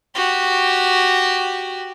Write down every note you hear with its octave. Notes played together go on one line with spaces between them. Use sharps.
F#4 G4